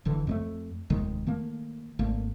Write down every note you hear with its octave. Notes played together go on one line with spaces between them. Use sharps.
F1 D3 E3
F2 G#3 A3
F1 D#2 D#3 G#3
D#3 A3 A#3
G#1 A3 A#3